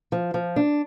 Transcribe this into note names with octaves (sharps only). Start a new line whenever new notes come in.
F3
F3
D4